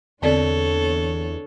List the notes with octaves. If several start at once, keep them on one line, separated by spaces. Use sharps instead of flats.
E2 D3 C4 D4 A4 C#5 D5